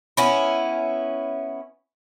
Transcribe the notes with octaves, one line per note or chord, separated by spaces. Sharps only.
B3 C#4 E4